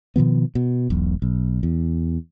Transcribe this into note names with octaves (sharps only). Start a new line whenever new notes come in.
B2 D#3 F3 B3
B2
E1 B1
B1
E2